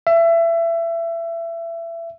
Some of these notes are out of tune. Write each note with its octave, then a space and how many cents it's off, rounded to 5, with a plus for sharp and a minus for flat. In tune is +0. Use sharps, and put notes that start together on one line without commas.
E5 +25